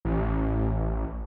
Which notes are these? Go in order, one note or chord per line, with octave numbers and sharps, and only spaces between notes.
A1